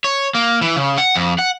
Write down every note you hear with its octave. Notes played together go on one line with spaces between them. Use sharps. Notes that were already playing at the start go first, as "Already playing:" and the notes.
C#5
A#3
E3
C#3
F#5
F2
F#5